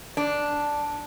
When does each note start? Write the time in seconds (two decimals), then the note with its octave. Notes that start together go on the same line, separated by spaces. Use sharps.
0.17 D4